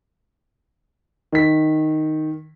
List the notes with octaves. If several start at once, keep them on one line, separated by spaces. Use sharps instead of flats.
D#3 B6